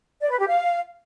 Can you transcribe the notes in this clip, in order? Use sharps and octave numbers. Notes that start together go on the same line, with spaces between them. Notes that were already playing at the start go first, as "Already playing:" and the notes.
D5
B4
G4
F5